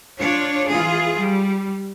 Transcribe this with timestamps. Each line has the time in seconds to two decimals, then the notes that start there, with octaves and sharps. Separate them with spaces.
0.20 D4 F4 C#5
0.70 E3 F4 G#4
1.19 G3